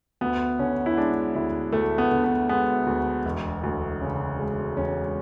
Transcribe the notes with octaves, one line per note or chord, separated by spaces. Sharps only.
D2 B3
D3 C#4
E4
G#3 D4
D2 E4
D2 A3
B3
D3
B3
G#3 B3
D2
E1
D2
C#3
G#3
E1 C#4